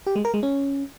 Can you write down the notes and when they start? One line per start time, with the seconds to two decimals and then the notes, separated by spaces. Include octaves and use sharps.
0.07 G4
0.16 G#3
0.25 A#4
0.34 G#3
0.43 C#4